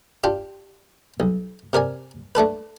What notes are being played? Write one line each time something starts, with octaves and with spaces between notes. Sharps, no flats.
D4 F4 G4
B1
C3 A#4 D5 G#5
A3 D4 A4 B4